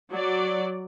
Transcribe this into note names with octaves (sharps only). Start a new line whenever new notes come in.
F#3 D5